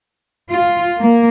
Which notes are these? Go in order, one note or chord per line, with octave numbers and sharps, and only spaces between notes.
F4
A#3